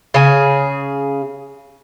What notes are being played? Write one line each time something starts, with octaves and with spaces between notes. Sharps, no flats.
C#3 G#4